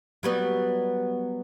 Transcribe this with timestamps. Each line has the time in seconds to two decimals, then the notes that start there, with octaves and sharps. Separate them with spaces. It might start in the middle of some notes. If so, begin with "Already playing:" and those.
0.23 F#3 G3 B3